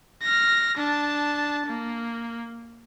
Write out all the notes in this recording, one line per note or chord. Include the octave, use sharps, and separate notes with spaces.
F6 A#6
D4 A5
A#3